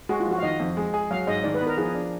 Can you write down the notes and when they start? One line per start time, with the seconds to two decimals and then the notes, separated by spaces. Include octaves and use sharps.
0.09 G#3 F#4
0.20 F4
0.26 F3
0.32 F#4
0.38 F5
0.43 D#3 D#5
0.60 F2
0.77 G#3
0.94 G#4
1.11 F#3 F5
1.27 G#2 D#5
1.44 D#3 D5
1.55 B4
1.61 B3
1.67 A#4
1.77 F3 G#4
1.95 D4